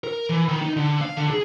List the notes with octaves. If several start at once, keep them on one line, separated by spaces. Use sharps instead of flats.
A#4
E3
D#3
D#4
D3
F5
D3
G#4